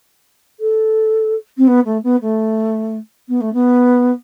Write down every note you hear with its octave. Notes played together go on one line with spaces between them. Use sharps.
A4
C4
B3
A3
B3
A3
B3
A3
B3